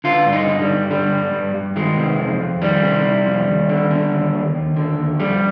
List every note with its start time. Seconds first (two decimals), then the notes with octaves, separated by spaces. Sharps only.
0.04 D3 F4
0.26 G2
0.33 D#4
0.47 D3
0.62 G3
0.69 G2
0.90 D3 G3
1.11 G2
1.33 G2
1.54 G2
1.76 D#3 G#3
1.97 C3
2.19 F2
2.40 F2
2.62 D#3 G3
2.83 C3
3.05 C3
3.26 F2
3.48 D#2
3.69 D3
3.91 D3
4.12 D#2
4.34 D#2
4.55 D#2
4.77 D3
4.98 D#2
5.19 F2 G3